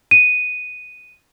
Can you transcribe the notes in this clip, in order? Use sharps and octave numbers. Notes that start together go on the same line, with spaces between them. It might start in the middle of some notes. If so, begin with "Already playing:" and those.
D#7